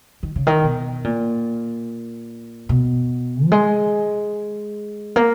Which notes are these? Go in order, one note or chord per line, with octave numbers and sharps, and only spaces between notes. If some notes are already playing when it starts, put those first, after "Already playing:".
D#3
C#3
D#3
B2
A#2
B2
F#3
G#3
A#3